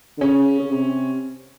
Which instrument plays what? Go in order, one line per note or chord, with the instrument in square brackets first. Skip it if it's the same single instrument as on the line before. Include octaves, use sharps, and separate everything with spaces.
[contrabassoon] D3
[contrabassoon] C#3 [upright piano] C#4
[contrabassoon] C#3
C3